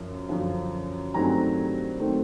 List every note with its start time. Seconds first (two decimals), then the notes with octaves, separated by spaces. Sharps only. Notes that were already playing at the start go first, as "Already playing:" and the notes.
Already playing: F#2 F3
0.29 F#2 D3 F3
1.14 G2 D#3 F#3 A3 C4 G#5 A#5
2.00 D#3 F#3 A3 C4